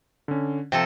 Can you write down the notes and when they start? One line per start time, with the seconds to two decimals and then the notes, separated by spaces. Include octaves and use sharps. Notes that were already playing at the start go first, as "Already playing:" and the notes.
0.28 D3 C#4
0.72 C3 F3 A4 G5